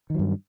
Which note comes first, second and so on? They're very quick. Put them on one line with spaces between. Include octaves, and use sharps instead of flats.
D#3 F#3 G2